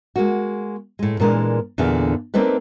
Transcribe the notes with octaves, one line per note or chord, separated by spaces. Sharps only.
G#3 A#3 F#4
A2 G#3
A#2 E3 G#3 D4 A#4
E2 A#2 D3 D4 G#4 F5
A3 A#3 C4 D4 D#4 B4